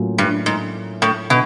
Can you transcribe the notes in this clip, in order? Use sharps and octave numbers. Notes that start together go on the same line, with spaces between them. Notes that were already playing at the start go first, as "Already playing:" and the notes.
Already playing: A2 F#3 A#3 C#4 F4
G2
G#2
A2
B2